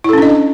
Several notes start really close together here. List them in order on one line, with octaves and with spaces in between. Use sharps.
E4 A4 C#4 D4 D#5